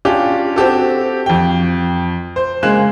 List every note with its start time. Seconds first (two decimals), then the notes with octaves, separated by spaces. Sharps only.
0.05 C#4 D4 F4 G4
0.56 C4 F#4 G4 A4
1.26 F2 G5
2.36 C5
2.63 C#3 G#3 A#3 F#6 E7